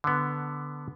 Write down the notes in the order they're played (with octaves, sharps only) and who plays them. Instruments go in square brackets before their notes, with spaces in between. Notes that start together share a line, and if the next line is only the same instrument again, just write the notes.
[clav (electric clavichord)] D3 B3